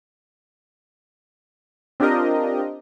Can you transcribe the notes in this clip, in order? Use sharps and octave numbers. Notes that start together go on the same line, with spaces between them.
C4 D4 F4 G4 A#4 D#5